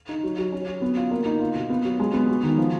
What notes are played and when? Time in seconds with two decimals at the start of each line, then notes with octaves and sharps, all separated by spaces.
0.09 D#4
0.23 F#3
0.38 F#3
0.52 C#4
0.67 F#3
0.82 B3
0.97 F4
1.11 A#3
1.26 D#4
1.40 F4
1.55 B2
1.70 B3
1.85 F#3
2.00 G#3
2.14 B3
2.28 F#4
2.43 D#3
2.58 F3